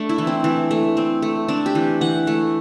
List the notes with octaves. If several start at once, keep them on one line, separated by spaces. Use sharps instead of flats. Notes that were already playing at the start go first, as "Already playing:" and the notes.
Already playing: A3 D4
E4
E3
C4
E3 D4
A3
C4
A3
C4 D4
G4
E3
E3 F#5
A3